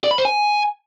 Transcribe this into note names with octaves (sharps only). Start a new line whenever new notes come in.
D5
B5
C5
G#5